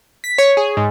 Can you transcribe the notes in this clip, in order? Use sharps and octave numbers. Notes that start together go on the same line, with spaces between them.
B6
C#5
G#4
G#2